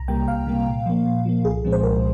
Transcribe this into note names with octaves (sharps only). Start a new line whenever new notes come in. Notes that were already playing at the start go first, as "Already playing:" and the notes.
Already playing: C2 A#5
C3 G3 A#3 G5
C2 F5
C3 G3 A#3
A#2
F3 A#3
A#2
F3 A#3
C2 G#4
A#2 F3 G#3 C4
C5
C2 A#4